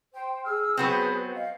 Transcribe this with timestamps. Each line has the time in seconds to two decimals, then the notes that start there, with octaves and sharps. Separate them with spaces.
0.13 C5 G5
0.44 G#4 E6 F6
0.77 F#3 B3 C4 G#4 B4 G6
1.35 D#5 F5